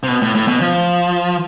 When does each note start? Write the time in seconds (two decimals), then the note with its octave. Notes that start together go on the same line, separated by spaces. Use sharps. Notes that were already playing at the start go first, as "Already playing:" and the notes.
0.03 C3
0.08 B2
0.22 A2
0.35 A2
0.48 B2
0.61 F3